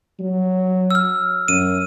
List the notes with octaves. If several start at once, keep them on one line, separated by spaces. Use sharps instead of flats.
F#3
E6 F6
F#2 D#7